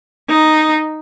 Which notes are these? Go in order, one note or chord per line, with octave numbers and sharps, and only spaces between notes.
D#4